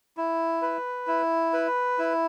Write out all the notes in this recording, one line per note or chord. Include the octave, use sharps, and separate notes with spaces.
E4
B4
E4
B4
E4